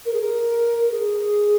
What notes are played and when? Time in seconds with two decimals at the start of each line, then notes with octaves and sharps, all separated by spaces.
0.05 A#4
0.13 G#4
0.19 A#4
0.91 G#4